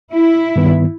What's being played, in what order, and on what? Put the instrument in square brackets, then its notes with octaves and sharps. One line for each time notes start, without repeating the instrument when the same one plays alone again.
[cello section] E4
[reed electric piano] G2 D#3 B3